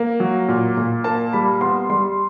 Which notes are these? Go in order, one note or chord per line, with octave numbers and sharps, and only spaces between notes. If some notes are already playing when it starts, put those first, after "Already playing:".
Already playing: A#3
F#3
A#2
A#2
A#3 A5
G3 B5
B3 C6
G3 C6